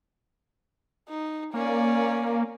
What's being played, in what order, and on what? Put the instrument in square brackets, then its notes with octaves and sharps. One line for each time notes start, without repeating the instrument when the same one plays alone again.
[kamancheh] D#4
[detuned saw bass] A#3 [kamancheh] C#4 D5